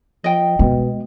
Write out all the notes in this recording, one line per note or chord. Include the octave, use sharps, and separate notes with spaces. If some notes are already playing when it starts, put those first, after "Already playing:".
F3 D#5 G5
B2 G#3